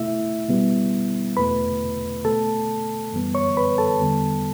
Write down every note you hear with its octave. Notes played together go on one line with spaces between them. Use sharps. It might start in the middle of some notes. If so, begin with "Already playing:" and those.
Already playing: B2 A3 E4 E5
B2 G3 B3
E2 B2 A3 B4 B5
B2 A3 A4 A5
F#2 E3 G3 B3
C#5 C#6
B4 B5
A4 A5
E2 D3 G3 B3